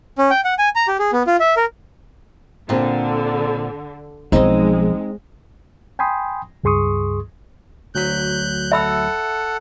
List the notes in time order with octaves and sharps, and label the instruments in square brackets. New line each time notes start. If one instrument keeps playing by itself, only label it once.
[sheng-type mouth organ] C#4
G5
F#5
G#5
A#5
G4
G#4
B3
F4
E5
A#4
[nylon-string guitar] A#2 C4 [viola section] D3
[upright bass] B1 F3 [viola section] G#3 [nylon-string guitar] C4 D#4
[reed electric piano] G5 G#5 B5 C6 D#6
C#2 G2 G#4 C6 C#6 D#6
[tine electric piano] D2 F#3 B6 [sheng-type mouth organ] F#6 G6
[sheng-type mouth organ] A4 F#5 [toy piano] E5 B5 E6